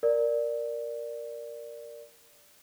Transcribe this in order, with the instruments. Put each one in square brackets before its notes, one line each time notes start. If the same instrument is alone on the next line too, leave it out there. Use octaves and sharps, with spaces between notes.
[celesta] A#4 D5